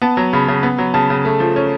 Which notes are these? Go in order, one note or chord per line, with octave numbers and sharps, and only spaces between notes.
B3 A5
F#3
C#3 B5
C#3
B3
F#3
C#3 A5
C#3
A3
F3
C#4